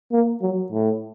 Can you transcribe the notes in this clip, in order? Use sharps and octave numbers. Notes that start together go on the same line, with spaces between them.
A#3
F#3
A2